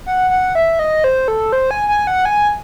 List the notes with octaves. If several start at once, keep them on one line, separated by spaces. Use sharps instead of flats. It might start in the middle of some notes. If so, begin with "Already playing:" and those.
F#5
F#5
E5
D#5
C5
A4
C5
G#5
G#5
F#5
G#5